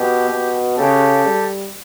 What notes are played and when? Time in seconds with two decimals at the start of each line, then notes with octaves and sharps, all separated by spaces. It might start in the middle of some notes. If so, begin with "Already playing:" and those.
Already playing: B2 G4
0.30 B2
0.77 C#3 G4 A4
1.26 G3